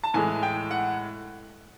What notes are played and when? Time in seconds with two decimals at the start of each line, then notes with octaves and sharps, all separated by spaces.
0.04 A5
0.14 A2 E3 G#3 G#5
0.43 G5
0.71 F#5